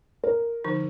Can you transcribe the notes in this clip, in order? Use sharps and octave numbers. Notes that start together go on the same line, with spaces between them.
A#4
D3 F3 D#4